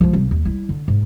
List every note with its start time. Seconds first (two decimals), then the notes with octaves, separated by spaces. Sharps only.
0.01 F3 G#3
0.13 C2 D#3
0.31 D#2
0.45 G3 E4
0.69 D3
0.88 G#2